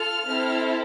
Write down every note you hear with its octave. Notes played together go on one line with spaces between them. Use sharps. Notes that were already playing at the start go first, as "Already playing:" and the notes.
Already playing: F4 A4 F6
C4 E4 A4